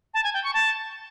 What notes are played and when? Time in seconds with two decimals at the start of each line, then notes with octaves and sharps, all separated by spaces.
0.14 A5
0.24 G#5
0.34 G5
0.44 C#6
0.54 A5